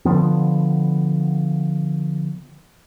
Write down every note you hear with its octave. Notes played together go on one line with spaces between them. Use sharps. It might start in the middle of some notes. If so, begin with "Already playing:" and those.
D3 E3 F3 B3